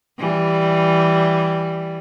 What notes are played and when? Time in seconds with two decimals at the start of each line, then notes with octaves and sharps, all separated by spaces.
0.18 E3 G3